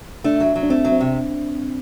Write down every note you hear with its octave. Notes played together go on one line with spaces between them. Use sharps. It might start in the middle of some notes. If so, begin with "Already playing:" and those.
A3 D4
F#3
F#3
D4
A3 C4
F#3
C4
C3